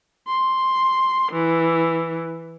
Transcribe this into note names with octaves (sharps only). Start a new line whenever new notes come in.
C6
E3